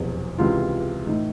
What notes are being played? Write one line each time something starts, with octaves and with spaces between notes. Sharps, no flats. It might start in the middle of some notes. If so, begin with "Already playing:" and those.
Already playing: F1 E2 B2 F#3
C#2 C3 E3 F4
A2 E3 D#4